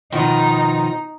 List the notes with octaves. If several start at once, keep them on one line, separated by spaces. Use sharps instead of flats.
B2 D#3 F3 D#4